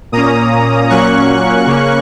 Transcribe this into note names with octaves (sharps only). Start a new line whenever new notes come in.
A#2 A#3 C#4 A#5 D#6
A#2 F#3 A#3 C#4 C#6 F#6
C#3 A#3 C#4